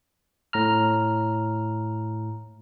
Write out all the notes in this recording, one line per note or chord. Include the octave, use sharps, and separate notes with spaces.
A2 A#5 F6